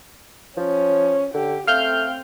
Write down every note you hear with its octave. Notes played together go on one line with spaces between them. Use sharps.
F3 C#4
D3 G4
A3 C4 F5 F6 G6